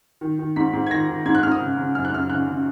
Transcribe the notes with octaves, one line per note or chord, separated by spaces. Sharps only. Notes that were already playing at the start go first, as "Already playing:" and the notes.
D#3
D#3
G#2 B6
G#2
G#6
D#3 A#6
D#3
G#2 G#6
F#6
G#2 F6
D#6
C#3
C#3
F#2 F6
F#6
F#2 F6
C#3 F#6
C#3